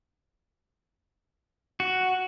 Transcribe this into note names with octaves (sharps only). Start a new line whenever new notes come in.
F#4